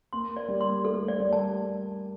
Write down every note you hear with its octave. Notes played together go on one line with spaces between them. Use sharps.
A#3 C6
D5
G3
C6
A3 A4
D5
G3
A5